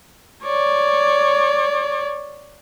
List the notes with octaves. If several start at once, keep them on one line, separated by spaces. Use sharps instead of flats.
C#5 D5